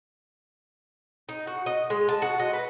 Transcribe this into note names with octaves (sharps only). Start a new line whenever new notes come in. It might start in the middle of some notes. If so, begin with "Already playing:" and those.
D#4
F#4
D#5
G#3
A5
F#4
D#5
B4